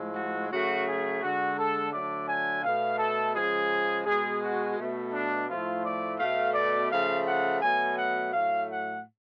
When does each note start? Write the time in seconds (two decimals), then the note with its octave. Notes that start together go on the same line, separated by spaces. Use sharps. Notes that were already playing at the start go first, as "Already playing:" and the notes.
Already playing: A2 F3 G#3
0.15 F#4
0.51 C#3 F#3 A3 F#4
0.86 G#4
1.21 D3 G#3 F#4
1.57 A4
1.92 D3 F#3 A3 D5
2.28 G#5
2.63 B2 A3 F5
2.99 A4
3.34 C#3 F3 G#3 G#4
4.06 B2 G#3 G#4
4.42 F#4
4.77 B2 A3
5.13 D4
5.48 A2 F3 A3 F4
5.83 D5
6.19 B2 A3 F5
6.54 D5
6.90 C#3 F3 A3 F5
7.25 F#5
7.61 B2 F#3 A3 G#5
7.97 F#5
8.32 A2 F#3 A3 F5
8.68 F#5